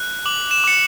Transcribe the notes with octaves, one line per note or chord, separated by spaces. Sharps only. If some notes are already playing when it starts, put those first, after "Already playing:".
Already playing: F#6
D6 F#7
E7
D6 C#7